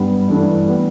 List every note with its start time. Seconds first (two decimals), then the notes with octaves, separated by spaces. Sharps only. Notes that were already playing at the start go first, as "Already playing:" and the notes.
Already playing: G2 G3 B3
0.27 G2 E3 A3 D4
0.67 G3 B3